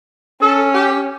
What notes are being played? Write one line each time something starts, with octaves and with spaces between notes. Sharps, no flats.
C#4 A4
G4